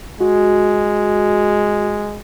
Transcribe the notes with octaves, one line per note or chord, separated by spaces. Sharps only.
G#3 F#4